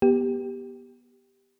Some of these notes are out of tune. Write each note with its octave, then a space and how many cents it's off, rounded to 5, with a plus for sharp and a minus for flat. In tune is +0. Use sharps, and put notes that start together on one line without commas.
B3 -25 G4 +0